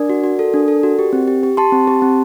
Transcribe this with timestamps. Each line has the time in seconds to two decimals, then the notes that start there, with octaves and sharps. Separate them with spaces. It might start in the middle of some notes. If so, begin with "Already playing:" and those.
Already playing: D4 A#4 D5
0.10 F#4
0.24 F#4
0.39 A4
0.54 D4
0.68 A4
0.83 F#4
0.99 G4
1.13 C4
1.28 G4
1.43 G4
1.57 G4 A5 C6
1.72 C4
1.87 G4
2.02 C4